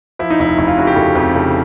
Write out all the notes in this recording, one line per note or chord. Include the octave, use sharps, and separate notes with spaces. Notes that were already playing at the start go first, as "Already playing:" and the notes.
F3 E4
D#4
F1 E4
F1 E4
F4
C#3 F#4
G4
F1 A4
F2
C#3 A4